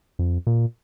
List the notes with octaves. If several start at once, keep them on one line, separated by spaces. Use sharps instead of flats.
F2
A#2